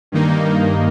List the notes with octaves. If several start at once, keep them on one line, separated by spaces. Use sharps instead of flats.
G2 D#3 A#3 D#4